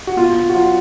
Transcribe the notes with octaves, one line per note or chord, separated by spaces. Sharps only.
F#4
B2 F4
B2
F#4
F#3 F4